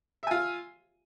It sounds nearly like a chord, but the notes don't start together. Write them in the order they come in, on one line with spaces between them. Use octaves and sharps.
E5 G#5 F4